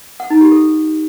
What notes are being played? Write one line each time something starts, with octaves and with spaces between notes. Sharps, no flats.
F#5
D#4
G4
A4